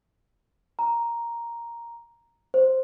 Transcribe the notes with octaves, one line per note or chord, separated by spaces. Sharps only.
A#5
C5